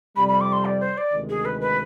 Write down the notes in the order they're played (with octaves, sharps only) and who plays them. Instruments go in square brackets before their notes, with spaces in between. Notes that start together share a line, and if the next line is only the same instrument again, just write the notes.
[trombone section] F2 C3 G3 [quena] B5
[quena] B5
D6
C6
D5
C5
D5
[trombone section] D2 C3 D#3 G#3
[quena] G#4
B4
B4